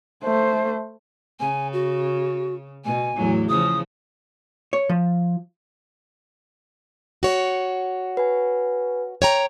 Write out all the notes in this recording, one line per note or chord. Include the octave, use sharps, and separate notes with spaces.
A3 C5
C#3 G#5
F#4
B2 G#5
E2 A2 F#3
C#3 F3 D#6
C#5
F3
F#4 C#5
B4 G#5
C#5 G5 A#5